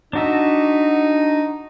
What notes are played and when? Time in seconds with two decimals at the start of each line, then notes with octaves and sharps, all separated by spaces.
0.13 D4 D#4 F#4 E5